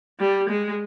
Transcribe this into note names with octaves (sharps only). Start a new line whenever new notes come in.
G3
G#3